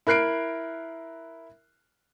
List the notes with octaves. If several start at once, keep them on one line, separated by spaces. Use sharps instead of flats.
E4 A#4 F#6 C7 D7